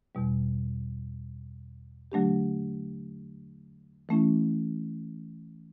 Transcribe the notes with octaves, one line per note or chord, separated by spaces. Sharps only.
E2 B2 G3
D3 F#3 A3 D4 G4
E3 A3 C#4 E4